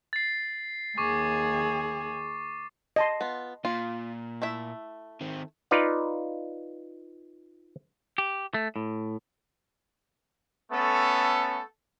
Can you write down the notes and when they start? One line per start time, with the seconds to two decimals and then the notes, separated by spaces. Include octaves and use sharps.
0.13 A6 C7
0.98 D#2 G#4 C#6 D6
2.96 D#5 A5 C6
3.21 B3 F4
3.65 A#2 F4
4.42 A3 E4 E5
5.21 D#3 C4
5.71 D#4 F4 B4 D5 F5
8.18 G4
8.54 A3
8.76 A2
10.72 A3 B3 C#4 A4